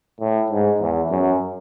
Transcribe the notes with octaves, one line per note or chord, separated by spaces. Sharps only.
A2
G#2
E2
F#2